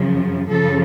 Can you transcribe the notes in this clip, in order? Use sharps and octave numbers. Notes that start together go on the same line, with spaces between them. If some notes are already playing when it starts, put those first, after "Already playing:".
Already playing: F#2 C#3 F3
F#2 C#3 F3 A4